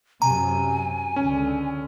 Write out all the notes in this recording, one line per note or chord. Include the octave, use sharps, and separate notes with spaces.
F#2 C3 G#5 A#5
C#2 D3 C#4